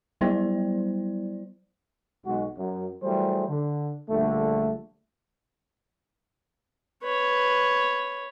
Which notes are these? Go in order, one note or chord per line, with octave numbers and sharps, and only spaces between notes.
F#3 G3 B3 E4 C5 D5
B1 G#3 F#4
F#2
E3 F#3 G3 A3 G#4 C5
D3
A#1 D3 G3 A3
B4 C#5